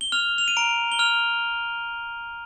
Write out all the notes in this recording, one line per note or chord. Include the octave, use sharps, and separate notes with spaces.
G7
F6 F7
F7
D#7
A#5 D7
G7
F6 F7